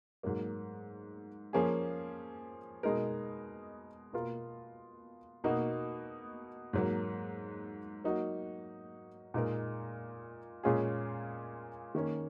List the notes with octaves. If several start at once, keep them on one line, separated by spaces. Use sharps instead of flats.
G#2 F#3 A#3
F3 A#3 C#4 G#4
B2 G#3 D#4 A#4
B2 A#3 F4 A#4
B2 A#3 D#4 F#4
G#2 F#3 A#3
F#3 A#3 D#4 F#4
A#2 G#3 D#4 A#4
A#2 G#3 C#4 F4 G#4
D#3 A#3 C#4